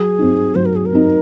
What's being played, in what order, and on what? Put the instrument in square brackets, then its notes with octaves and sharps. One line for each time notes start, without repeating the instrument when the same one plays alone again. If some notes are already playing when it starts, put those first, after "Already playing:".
Already playing: [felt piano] F#3 [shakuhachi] G#4
[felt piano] C4 D#4
[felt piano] F#3 [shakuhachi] C5
[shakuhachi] A#4
G#4
A#4
[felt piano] C4 D#4